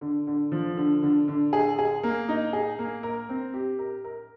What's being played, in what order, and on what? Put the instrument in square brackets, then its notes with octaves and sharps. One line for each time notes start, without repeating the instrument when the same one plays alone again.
[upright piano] D3
D3
F3
D3
D3
D3
G#4
G#4
A#3
D#4
G#4
A#3
A#4
C4
G4
A#4
A#4